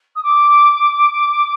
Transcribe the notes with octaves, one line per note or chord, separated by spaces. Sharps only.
D#6
D6